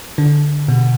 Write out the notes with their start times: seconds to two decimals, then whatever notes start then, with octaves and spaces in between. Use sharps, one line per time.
0.18 D3
0.68 B2